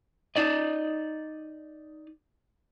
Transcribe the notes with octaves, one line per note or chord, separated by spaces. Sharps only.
D#4 D5 D#5